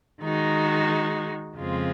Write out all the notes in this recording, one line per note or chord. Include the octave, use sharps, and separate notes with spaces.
D#3 G#3 D#4 F#4
F2 C#3 G#3 C4 F4